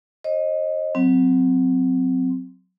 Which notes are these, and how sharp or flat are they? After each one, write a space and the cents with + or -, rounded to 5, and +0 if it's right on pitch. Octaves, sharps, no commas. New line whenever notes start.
C5 +40 D#5 +0
F#3 -10 C4 -10